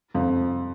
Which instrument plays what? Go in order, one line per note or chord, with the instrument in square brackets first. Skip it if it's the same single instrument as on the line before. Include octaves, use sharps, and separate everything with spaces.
[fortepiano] F2